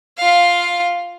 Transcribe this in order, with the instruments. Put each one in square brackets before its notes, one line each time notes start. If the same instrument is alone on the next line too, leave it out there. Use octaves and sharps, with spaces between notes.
[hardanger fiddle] F4 F5